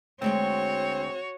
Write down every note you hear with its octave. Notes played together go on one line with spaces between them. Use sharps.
D2 G#3 C4 F#4 C#5 G5